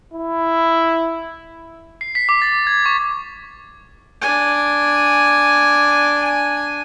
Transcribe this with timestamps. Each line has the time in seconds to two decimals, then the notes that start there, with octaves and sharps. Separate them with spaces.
0.14 E4
2.01 C7
2.15 B6
2.29 D6
2.42 A6
2.67 G#6
2.86 C#6
4.22 D4 G#5